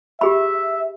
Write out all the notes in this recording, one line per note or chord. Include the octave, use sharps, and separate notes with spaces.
G4 G#4 E5 B5